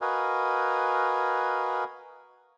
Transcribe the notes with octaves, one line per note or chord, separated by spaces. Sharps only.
F#4 A#4 B4 D#5 F5 G#5